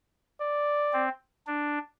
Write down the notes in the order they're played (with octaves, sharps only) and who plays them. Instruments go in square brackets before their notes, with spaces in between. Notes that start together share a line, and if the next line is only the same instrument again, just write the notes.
[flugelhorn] D5
[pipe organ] C4
D4